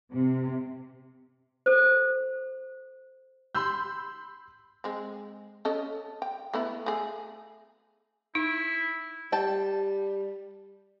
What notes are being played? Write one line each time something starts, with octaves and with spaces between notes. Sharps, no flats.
C3
A4 C5
B5 C6 E6 G6
G#3 C4
C#4 A4 D#5
G5
A3 B3 E4
A3 G#4
D#4 E4
G3 G5 A5